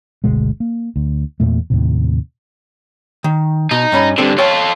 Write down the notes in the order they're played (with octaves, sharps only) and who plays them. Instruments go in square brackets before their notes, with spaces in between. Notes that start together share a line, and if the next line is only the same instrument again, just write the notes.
[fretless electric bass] G1 D2 B2 G#3
A#3
D2
E2 G2 A#2 A3
D#2 A2 C3
[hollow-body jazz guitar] D#3
[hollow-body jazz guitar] B2 [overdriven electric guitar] D#4
[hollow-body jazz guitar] G2 C#4 B5
[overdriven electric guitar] G2 D3 [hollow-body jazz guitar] C4 A4 C5
[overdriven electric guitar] F4 A4 [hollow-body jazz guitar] C#5 G5